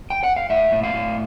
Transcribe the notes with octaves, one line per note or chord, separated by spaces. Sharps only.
G5
F#5
F5
A2 E5
A2
F5
A2